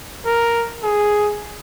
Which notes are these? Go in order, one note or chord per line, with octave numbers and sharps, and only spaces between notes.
A#4
G#4